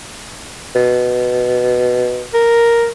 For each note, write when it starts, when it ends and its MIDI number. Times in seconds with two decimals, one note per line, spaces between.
0.76 2.26 47
2.34 2.88 70